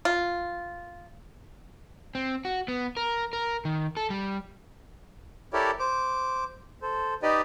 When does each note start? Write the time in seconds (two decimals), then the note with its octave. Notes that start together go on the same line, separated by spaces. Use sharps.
0.05 F4
2.15 C4
2.45 F#4
2.68 B3
2.97 A#4
3.33 A#4
3.65 D#3
3.97 A4
4.10 G3
5.53 E4 G4 A4 A#4 C#5 D5
5.79 C5 D6
6.82 A4 C5
7.22 D#4 G4 B4 D5 D#5